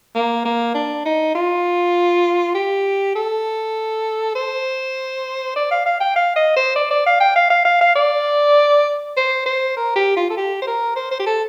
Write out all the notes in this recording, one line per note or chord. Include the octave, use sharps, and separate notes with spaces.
A#3
A#3
D4
D#4
F4
G4
A4
C5
D5
F5
F5
G5
F5
D#5
C5
D5
D5
F5
G5
F5
F5
F5
F5
D5
C5
C5
A#4
G4
F4
A4
G4
C5
A#4
C5
C5
G4
A4